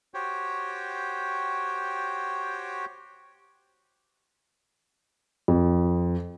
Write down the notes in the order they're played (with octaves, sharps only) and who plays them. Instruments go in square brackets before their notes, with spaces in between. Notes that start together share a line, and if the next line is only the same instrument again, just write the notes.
[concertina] F#4 G4 C5 C#5 G5
[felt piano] F2